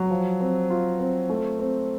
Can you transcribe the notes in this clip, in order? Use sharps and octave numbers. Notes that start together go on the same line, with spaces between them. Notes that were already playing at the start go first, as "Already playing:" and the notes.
Already playing: F#3
F3
C4
F4
C4
A3
C4